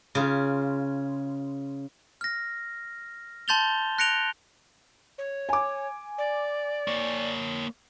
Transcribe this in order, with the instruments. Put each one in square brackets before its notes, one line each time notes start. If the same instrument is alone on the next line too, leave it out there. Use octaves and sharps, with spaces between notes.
[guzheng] C#3 F4
[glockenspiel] F6 A#6
A5 C6 G6 A6 F7 G7
F#6 A#6 C#7 D7 F7 G7
[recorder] C#5
[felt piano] G#5 D6
[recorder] D5
[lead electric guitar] A#3 C#5